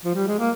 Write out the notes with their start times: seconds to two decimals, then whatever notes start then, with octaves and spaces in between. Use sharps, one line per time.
0.05 F3
0.15 G3
0.28 G#3
0.39 A#3